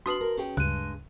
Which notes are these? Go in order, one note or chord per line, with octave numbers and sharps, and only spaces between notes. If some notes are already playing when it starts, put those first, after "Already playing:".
D4 F#4 B4 C6 D#6 C7 F#7
A#4
C#4 G#4 G5
D2 G2 C#3 G#3 F#6 D#7